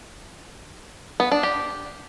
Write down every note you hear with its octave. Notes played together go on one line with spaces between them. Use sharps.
B3
D4
G4